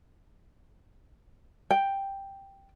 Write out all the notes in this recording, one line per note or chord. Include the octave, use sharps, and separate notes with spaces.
G5